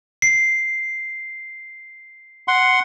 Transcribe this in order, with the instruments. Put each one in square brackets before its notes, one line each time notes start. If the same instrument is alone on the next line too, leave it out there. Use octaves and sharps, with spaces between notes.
[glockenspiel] C7
[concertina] F#5 C6